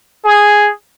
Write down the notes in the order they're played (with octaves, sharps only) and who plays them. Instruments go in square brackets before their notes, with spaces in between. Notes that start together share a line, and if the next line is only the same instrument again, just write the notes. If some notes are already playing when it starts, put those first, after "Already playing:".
[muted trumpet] G#4